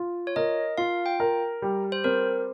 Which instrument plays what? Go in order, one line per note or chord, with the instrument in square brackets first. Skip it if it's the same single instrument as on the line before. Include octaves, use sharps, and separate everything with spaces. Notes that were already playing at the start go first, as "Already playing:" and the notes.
Already playing: [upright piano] F4
[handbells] C#5
[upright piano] A#4 [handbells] D#5
[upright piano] F4 [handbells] F5
[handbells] G5
[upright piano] A#4
G3
[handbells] C5
[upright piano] C4 [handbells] A#4